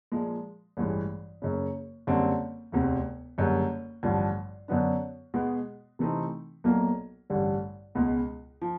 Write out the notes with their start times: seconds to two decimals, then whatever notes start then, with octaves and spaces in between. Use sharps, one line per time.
0.12 A#2 F3 G#3
0.77 A1 G2 E3 G#3
1.42 F#1 F#2 C#3
2.07 F#1 F#2 D3 G3 C4
2.72 E1 D2 C3
3.38 F#1 F#2 D3 G3
4.03 A1 G2 D3 F3
4.68 F#2 D3 F#3 B3 D4
5.34 B2 G#3 B3
5.99 C3 E3 A3 C4 D#4
6.64 B1 A#2 F#3 A#3
7.30 A1 G2 D3 G3
7.95 C#2 B2 G#3
8.62 F3